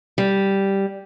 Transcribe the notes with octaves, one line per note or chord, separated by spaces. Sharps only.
G3